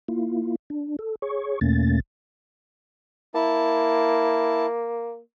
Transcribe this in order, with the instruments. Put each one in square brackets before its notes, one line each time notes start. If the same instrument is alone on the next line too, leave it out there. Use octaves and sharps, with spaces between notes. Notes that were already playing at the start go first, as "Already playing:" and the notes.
[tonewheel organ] A#3 E4 F4
D4
A4
G#4 C#5 C#6
E2 B2 A3 A#3 C#4 A6
[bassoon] A#3 [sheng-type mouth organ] E4 A5